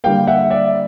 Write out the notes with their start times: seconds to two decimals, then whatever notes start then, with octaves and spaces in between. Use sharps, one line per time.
0.04 D3 G3 A#3 F5 G5
0.27 E5 F#5
0.50 D5 E5